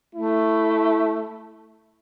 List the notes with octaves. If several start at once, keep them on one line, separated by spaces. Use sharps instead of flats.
A3 E4